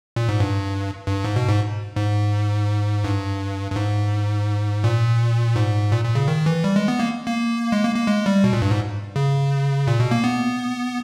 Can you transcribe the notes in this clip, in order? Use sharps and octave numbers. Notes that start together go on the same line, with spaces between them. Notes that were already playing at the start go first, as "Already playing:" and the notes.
A#2
G#2
G2
G2
G#2
B2
G#2
G#2
G2
G2
G#2
A#2
G#2
A#2
A#2
C#3
D#3
E3
G3
G#3
B3
A#3
A#3
G#3
A#3
A#3
G#3
G3
B2
A#2
G2
G#2
C#3
A#2
B2
A#3
B3